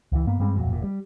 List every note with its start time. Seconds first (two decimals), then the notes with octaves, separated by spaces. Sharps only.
0.12 C#2 E3
0.27 G2 A#3 B3
0.39 G2 G3 G#3 C4
0.56 D1 F2 A#2 F#3
0.72 F1 A#2
0.84 G3